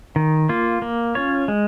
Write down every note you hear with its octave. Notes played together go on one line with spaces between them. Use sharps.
D#3
A#3 F4
A#3
C#4 F4 C#5
G#3